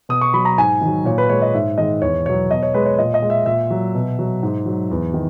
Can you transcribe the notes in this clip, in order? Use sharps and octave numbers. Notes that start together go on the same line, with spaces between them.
B2 D#6
C#6
F#3 B5
A#5
G#2 G#5
D#3 F#3
A#2 C#5
B4
G#3 C#5
D#5
G#2 E5
D#3 G#3 D#5
E2 C#5
B2 F#3 C#5
B2 D#5
C#5
G#3 B4
C#5
A#2 D#5
D#5
G#3
E5
A#2 E5
F#3
B2
F#3
G#2
F#3
E2
D#3